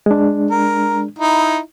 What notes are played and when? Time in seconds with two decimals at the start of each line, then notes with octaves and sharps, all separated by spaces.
0.06 G#3 D4
0.51 A#4
1.19 D#4 E4